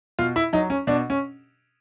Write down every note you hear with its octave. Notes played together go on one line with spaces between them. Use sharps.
B2 F4
E4
F#3 D#4
C#4
B2 D4
C#4